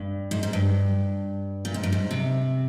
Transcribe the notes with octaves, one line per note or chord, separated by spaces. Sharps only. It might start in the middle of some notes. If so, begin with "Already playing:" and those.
Already playing: G2
G#2
G#2
G2
A#2
G#2
G2
G#2
C3